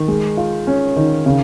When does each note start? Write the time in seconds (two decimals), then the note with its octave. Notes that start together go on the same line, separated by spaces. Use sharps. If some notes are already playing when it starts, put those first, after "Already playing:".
Already playing: D#3
0.08 G#3
0.37 F4
0.67 C#4
0.96 D#3
1.26 C#3